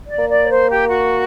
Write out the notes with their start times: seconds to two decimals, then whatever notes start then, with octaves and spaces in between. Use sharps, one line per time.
0.08 D5
0.19 A#3
0.29 D5
0.42 C#5
0.50 C5
0.70 G4
0.90 F#4